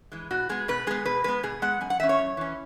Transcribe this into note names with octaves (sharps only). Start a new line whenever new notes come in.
E3 G#3
B2 F#4
G#3 B3 G#4
B2 B4
G#3 B3 G#4
B2 B4
G#3 B3 B4
B2 G#4
G#3 B3 F#5
F#2 G#5
F#5
E3 C#4 E5
C#5
F#2
E3 C#4